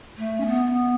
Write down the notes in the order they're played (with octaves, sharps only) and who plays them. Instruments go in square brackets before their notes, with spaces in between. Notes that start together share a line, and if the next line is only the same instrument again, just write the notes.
[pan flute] A3
C#4
B3